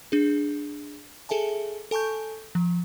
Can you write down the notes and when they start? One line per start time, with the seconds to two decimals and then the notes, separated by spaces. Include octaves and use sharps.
0.12 D4 G#4
1.29 G#4 A4 E5 G#5 A5
1.91 A4 G#5 A5 C#6 G6
2.55 F3